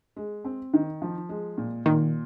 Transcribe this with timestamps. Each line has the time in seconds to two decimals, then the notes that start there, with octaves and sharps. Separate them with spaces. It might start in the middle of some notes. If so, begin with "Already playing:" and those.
0.16 G#3
0.45 C4
0.74 D#3
1.02 F3
1.29 G#3
1.58 A#2
1.86 A#2 D#3